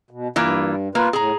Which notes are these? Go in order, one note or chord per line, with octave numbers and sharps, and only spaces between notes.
B2
G2 E3 A#3 F4
A#3 F4 B4
A2 G#4 A#5